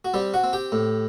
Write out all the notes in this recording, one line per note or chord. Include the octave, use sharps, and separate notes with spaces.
F#4
G3 C4 G4
F#4 F#5
C4
G4 G5
A2